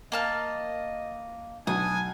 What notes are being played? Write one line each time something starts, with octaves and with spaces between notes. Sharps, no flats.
A#3 D#5 A5 F6
B1 D4 G#5 D#6